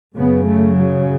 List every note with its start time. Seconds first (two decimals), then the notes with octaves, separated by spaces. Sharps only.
0.15 F#2 C#3 B3
0.45 A3
0.75 F#3